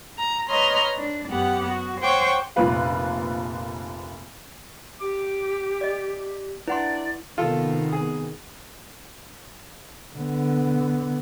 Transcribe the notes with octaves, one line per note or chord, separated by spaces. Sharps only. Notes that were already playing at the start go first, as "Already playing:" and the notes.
A#5
B4 C#5 D#5 A#5 C6 F6
D4
F#2 B3 G4 F#5
F#4
C5 C#5 F#5 G5 C#6 D6
F1 A#1 F3 A#3 B4 F5
G4 D6
D5 D#5
D4 E4 B4 D5 F#5 C6
C3 D#3 B3 F4 A4
G#4
D3 B3